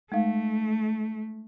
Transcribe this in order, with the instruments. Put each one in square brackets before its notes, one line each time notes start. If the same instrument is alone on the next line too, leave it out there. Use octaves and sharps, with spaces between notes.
[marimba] G#3 D#4 F5 [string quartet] A3